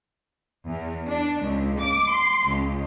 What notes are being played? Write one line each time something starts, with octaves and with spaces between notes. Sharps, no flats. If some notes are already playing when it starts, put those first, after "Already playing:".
E2
D4
C#2
D6
C6
C#2